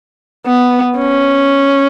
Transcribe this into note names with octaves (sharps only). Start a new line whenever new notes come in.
B3
C#4